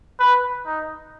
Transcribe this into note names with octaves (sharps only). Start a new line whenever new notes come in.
B4
D#4